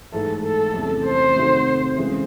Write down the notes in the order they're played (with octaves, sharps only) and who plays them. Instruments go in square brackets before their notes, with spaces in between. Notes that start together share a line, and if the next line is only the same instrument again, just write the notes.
[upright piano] G#2 E3 A3 [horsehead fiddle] A4
[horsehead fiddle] A4
[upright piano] E2 C3 E3 A3 C#4
[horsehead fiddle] C5
[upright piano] C3 D#3 A3 D#4 F#4
C#3 E3 G#3